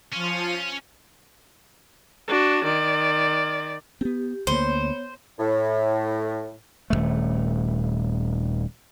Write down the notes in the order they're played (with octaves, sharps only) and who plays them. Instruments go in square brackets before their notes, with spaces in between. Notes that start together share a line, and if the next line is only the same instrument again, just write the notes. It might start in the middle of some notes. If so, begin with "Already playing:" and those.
[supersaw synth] F3 F4 D#7 [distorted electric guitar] C#4
[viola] D4 F#4
D#3 D5
[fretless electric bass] B3 C4 [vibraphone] G4
[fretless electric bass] D2 A#3 [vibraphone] B3 C#5 [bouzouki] C5
[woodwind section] A2
[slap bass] D#1 F2 A3